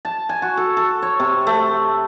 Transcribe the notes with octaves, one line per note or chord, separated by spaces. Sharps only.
A5
G#5
F#4
A4
A4
C#5
C3
A3